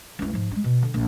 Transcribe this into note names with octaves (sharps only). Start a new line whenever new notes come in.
C#2 E4
G#2 F3
G#3 D4
B2
D3
A#1